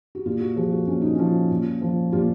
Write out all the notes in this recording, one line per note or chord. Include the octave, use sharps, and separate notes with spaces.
F#4
A#2 F4
F#4
F3 G#4
F#4
A#2 C#4
D#4
F3 C#4
A#2
F3
A#2 F4